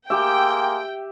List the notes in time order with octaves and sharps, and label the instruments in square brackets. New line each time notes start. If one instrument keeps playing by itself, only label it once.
[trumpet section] A#3 G#4 C6 [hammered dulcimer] G4 E5 [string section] G5